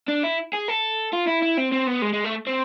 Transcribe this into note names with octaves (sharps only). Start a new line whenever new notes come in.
D4
E4
G#4
A4
F4
E4
E4
C4
C4
B3
G#3
G#3
A3
C4